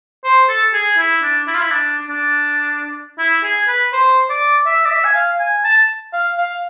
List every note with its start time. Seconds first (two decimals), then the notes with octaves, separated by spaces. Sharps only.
0.24 C5
0.49 A4
0.73 G#4
0.98 E4
1.23 D4
1.47 E4
1.54 F4
1.62 E4
1.71 D4
2.08 D4
3.18 E4
3.43 G#4
3.68 B4
3.93 C5
4.30 D5
4.66 E5
4.85 D5
4.91 E5
5.04 G#5
5.15 F5
5.40 G#5
5.64 A5
6.13 F5
6.38 F5